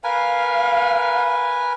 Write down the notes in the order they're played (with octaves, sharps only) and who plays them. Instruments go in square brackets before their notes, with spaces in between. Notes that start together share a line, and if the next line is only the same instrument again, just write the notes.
[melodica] A#4 B4 G#5 [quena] F5